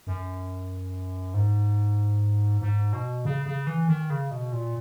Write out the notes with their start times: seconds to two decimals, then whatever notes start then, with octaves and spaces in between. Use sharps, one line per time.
0.07 F#2
1.34 G#2
2.61 G#2
2.93 B2
3.25 C#3
3.46 C#3
3.67 E3
3.88 D#3
4.10 C#3
4.31 B2
4.53 A#2